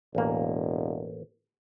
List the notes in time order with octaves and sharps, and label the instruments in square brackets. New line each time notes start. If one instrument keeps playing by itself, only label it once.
[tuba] E1 [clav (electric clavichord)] A1 A#3